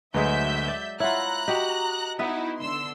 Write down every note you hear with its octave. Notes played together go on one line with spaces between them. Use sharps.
D2 F#3 G#3 B4 E5 G6
D5
E4 F4 C#5 E5 F#5 A#5 F#6
F#4 G4 D#5
B3 D#4 E4 B4 E5
D3 C6 E6